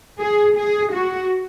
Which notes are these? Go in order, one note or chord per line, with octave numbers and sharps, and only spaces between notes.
G#4
G#4
F#4